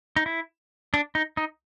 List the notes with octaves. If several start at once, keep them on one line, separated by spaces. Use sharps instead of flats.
D#4
E4
D4
D#4
D#4